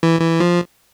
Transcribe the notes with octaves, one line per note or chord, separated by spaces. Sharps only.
E3
E3
F3